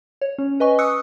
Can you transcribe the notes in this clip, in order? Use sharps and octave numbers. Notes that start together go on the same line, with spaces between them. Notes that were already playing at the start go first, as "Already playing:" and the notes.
C#5
C#4
B4 D#5 G#5 C#6
C#6 D#6 E6 F#6 C#7